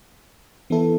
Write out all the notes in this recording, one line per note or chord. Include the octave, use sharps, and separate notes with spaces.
E3 B3 E4 A4